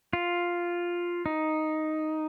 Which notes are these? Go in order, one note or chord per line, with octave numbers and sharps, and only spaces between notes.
F4
D#4